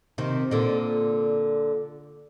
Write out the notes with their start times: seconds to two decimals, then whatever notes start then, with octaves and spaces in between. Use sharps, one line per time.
0.18 C3 D#3
0.51 A#2 D3